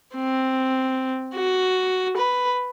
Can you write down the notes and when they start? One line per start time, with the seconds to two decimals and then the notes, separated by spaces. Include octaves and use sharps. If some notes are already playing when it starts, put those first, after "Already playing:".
0.15 C4
1.35 F#4
2.17 B4